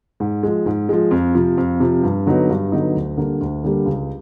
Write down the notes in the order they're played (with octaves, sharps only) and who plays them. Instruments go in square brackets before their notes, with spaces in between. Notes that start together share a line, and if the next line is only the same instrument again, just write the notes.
[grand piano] G#2
F3 G#3
G#2
F3 G#3
F2
C3 F3
F2
C3 F3
G2
D3 F#3 B3 D#4
G2
D3 F#3 B3 D#4
D2
D3 G3 A#3
D2
D3 G3 A#3
C#2